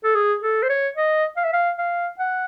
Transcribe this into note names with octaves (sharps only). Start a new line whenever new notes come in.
A4
G#4
A4
C5
C#5
D#5
F5
E5
F5
F5
F#5